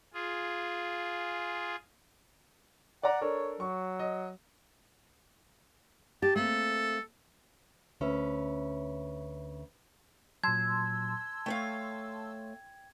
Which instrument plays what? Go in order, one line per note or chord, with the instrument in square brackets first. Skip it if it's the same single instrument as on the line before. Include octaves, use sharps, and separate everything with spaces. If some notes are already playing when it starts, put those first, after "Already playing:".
[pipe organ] F4 G#4
[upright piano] D5 A#5 [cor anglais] F#5
[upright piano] D4 A4 A#4 [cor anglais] C#5
[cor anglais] F#3 [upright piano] C#6
[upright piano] D#5
[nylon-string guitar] G4 [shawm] A5
[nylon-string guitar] A3 A#3 C4 [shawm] A4
[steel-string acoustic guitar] D2 C#4 B4 E5
[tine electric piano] A#2 F#3 [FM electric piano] A5 C6 E6 [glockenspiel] G#6
[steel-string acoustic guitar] A3 C#5 F5 [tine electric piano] G5